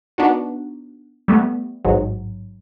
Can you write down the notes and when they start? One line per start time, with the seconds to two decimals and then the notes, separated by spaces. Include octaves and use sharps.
0.18 B3 D4 D#4 F#4
1.28 G3 A3 B3
1.85 A1 G#2 F#3